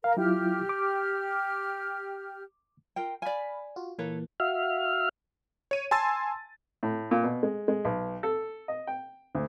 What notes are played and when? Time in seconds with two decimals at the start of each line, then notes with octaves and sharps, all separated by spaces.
0.04 A#4 F5
0.17 F#3 E4 F4 G4 F6
0.69 D6
2.96 F4 A#4 G5
3.22 D5 F5 G#5 B5
3.76 F4 F#4
3.99 A#2 E3 A#3 A4 B4 C#5
4.40 F#4 E5 F5 F6
5.71 C#5 D#7
5.91 G#5 A5 C6 E6 A6
6.83 A2
7.11 A#2
7.24 B2
7.43 G#3
7.68 G#3
7.85 B1
8.23 A4
8.68 D#5
8.87 G5
9.35 D2